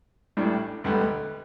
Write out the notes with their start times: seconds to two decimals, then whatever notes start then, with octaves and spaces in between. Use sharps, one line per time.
0.37 A1 A2 G3 D4
0.84 E1 D2 D3 G3 B3